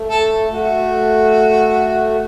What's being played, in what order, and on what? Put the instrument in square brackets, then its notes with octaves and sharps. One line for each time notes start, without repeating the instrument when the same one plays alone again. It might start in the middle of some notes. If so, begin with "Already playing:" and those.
Already playing: [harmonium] A3
[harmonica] A4
[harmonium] A3 [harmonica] F#4